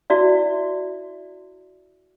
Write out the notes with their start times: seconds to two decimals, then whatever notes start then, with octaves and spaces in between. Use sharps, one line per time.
0.10 E4 F#4 D5 E5